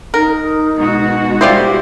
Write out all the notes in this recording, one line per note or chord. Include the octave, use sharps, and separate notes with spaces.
D#4 A#4
B2 G#3 F#4
G3 E4 F4 G4 C5